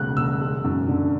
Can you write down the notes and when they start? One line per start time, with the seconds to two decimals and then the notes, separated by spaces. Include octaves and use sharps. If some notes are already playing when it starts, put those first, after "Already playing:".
Already playing: E1 D2 C#3 F#6
0.17 E1 E6
0.41 G#3
0.64 F#2
0.88 D3